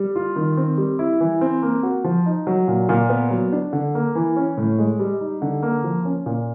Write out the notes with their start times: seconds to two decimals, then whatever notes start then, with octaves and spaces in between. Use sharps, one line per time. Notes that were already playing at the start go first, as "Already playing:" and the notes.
Already playing: G3
0.16 F4
0.36 D#3
0.57 C4
0.78 G3
0.99 E4
1.21 E3
1.41 C4
1.63 A#3
1.83 F#4
2.04 F3
2.26 D#4
2.47 F#3
2.68 A#2
2.89 A#2
3.09 B3
3.31 F#3
3.52 D4
3.73 D3
3.95 A#3
4.15 E3
4.36 C#4
4.57 A2
4.79 G#3
4.99 G3
5.20 D#4
5.42 D3
5.63 A#3
5.84 F3
6.05 C#4
6.26 A#2